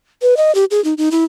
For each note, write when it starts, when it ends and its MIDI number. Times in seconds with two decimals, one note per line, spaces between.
0.22 0.37 71
0.37 0.53 75
0.55 0.65 67
0.71 0.83 68
0.84 0.94 63
0.98 1.09 63
1.11 1.24 64